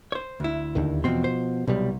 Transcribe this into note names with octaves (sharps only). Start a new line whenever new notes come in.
C5 C#5
D2 E4
D#2 D3 D#3
E2 B2 F3 C4 C6
C5
C2 B2 F#3 G3